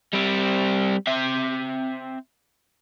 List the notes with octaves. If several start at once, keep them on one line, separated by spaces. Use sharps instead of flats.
G3 C4
C4 E5